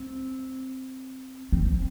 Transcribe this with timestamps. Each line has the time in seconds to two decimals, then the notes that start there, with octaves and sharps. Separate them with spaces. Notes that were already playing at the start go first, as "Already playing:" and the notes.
Already playing: C4
1.52 C4